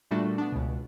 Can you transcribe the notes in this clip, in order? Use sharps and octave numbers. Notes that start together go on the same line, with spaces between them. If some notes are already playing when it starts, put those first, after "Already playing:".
A#2 G3 A3 D4 F#4
B3 D4
C#2 B2